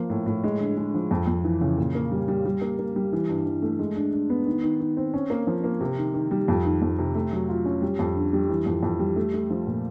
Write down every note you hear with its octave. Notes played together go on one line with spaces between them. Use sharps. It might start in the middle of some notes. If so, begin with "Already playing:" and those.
Already playing: F3 A#3
A2
A2
G#3
D3
G#3
F3
F2
F2
E3
C#3
A#2
A#3
G3
G3
G3
A#3
A#3
G3
E3
G2
E3
A3
G#3
D4
D4
B3
D#3
D#3
D#3
C4
C#4
A#3
F3
A#3
C3
D#3
D#3
G3
F2
D#3
F2
C3
A3
F#3
F4
C#4
G3
F2
D3
G3
E3
F2
F2
G3
A3
A3
F3
A#2